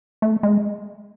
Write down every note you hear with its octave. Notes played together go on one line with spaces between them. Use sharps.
A3
G#3